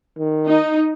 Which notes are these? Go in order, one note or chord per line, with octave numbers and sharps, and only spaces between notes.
D#3
D#4